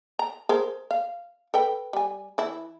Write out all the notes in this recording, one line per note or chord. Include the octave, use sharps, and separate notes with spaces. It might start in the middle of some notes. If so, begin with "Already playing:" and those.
A#5
G#4 A#4 C5
F5
A4 B4 G5
G3 G#5
E3 E4